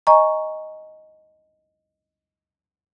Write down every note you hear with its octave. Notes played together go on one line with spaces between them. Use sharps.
D#5 G#5 A#5 C#6